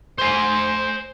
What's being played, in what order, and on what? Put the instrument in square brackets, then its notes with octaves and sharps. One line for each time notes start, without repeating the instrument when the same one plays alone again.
[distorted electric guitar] C5 G#5